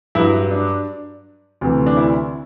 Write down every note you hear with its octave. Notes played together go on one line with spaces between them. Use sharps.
G2 F#3 E4
D4
D2 C3 E3
D4
E4